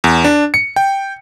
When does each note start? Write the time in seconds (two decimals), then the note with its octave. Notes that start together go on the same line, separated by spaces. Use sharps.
0.04 E2
0.24 D4
0.54 C#7
0.76 G5